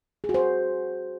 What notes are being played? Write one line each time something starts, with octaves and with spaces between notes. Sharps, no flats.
G#4
F#4
C5